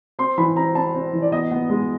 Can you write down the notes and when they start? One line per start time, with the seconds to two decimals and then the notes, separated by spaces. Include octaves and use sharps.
0.19 C4 C6
0.38 E3 B5
0.56 C4 A#5
0.75 C4 A5
0.95 C4
1.13 E3
1.22 D5
1.32 B3 D#5
1.51 B3
1.70 G#3